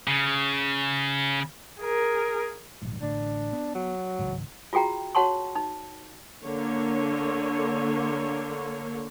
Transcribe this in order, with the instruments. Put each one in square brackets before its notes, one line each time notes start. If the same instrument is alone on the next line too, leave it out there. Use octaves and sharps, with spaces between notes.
[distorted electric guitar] C#3
[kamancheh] G#4 A#4
[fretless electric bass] D1 A#1 G#2
[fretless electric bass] A1 A2 D3 [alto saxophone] D4
[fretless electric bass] B3
[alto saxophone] F#3
[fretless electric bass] G#1 C#2 G#2
[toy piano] F4 F#4 G#4 G5 A#5
F#4 C#5 F#5 A5 C6 C#6
D#4
[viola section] D3 A#3 C#5